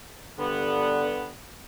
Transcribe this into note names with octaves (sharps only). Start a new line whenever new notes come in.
G2 D3 B3